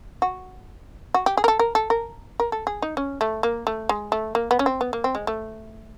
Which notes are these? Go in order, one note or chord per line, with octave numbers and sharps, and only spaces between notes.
F#4
F#4
G4
G#4
A#4
A4
A#4
A4
A#4
A#4
A4
G#4
D#4
C#4
A3
A#3
A3
G#3
A3
A#3
B3
C#4
C4
B3
A#3
C4
G#3
A3